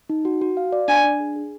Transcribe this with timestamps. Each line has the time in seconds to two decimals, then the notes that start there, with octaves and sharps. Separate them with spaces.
0.10 D#4
0.25 F#4
0.41 F#4
0.57 F5
0.72 D5
0.88 D4 G#5
1.04 D4
1.20 G#4
1.36 G#4